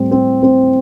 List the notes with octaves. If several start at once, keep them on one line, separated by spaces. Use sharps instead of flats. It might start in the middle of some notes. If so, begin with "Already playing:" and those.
Already playing: A2 G3 C4
C4
C4